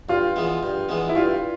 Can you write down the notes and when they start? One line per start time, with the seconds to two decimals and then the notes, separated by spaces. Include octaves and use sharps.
0.09 G2 F4
0.36 E3 G#3 B3
0.63 G2
0.89 E3 G#3 B3
1.09 E4
1.15 G2 F4